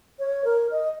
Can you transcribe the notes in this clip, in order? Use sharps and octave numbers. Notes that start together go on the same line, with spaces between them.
C#5
A#4
D#5